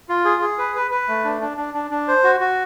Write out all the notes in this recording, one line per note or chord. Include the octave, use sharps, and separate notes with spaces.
F4
G#4
G#4
B4
B4
B4
A3
D4
D4
D4
D4
D4
C5
F#4
F#4